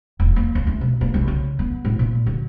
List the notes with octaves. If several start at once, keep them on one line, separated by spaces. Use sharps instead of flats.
E1
A#3
C#2
A3
B2
A#3
C2
C#3
B3
A2
A#2
D3